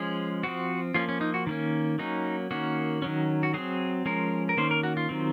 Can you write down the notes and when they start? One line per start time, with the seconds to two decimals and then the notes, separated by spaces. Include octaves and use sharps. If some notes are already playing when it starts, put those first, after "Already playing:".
Already playing: F3 G#3 C#4 G#4
0.43 F3 C4 F#4
0.94 F3 A#3 C#4 F4
1.09 C#4
1.21 D#4
1.34 F#4
1.47 D#3 A#3 C#4
1.99 F#3 A#3 C#4 D#4
2.51 D#3 A#3 C#4 F#4
3.02 D#3 F#3 C#4
3.43 F#4
3.54 F#3 C4 G#4
4.06 F3 G#3 C#4 A#4
4.49 A#4
4.57 D#3 A#3 C#4 C5
4.71 A#4
4.83 F#4
4.97 F4
5.09 D#3 F#3 C4